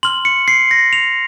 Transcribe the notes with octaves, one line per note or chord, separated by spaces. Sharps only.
C6 F6 F#7
C#7
C7
A#6
F7